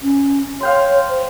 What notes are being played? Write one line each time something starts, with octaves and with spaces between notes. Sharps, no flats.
C#4
C#5 F5 G5 C6
C5